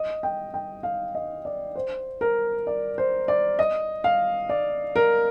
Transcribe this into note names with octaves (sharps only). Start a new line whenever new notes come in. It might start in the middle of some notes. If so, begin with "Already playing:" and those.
Already playing: D#5
G5
G5
F5
D#5
D5
C5
A#4
D5
C5
D5
D#5
F5
D5
A#4